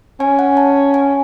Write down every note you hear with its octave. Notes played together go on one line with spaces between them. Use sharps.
C#4 G#5
F#5
A5
G#5